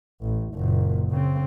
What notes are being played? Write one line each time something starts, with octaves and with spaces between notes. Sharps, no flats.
A1
F#1 A#2
C#3 C4